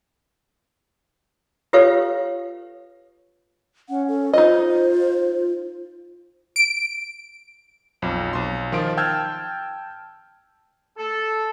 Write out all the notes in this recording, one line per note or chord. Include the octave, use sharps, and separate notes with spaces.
F4 G4 A4 B4 C#5 F5
C#4 F#5
A4
D#4 F4 C5 D#5
D7
B1 F2
B1 C6
D#3 F3 F4 D7
G5 A5 E6 F6 G6 G#6
A4